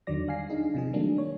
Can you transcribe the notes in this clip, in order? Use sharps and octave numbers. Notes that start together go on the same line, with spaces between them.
E2 D3 D#3 F#3 D5 A#6
G3 F5 G#5 C7
D4 D#4 G#4
C3 F3 G#4
D#3 F#3 G3 A3 A#3 D4
C#5